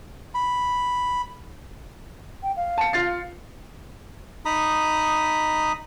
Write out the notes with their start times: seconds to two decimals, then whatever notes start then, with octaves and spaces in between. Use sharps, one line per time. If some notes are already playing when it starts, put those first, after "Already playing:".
0.35 B5
2.43 G5
2.57 F5
2.78 A5 C#7
2.93 F4 A6 C7
4.45 D#4 A#5 B5 D#6